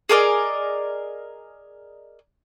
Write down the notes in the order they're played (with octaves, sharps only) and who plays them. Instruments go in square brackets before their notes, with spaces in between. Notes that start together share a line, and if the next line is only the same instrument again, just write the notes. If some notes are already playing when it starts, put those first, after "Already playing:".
[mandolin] G#4 A#4 D5 D#5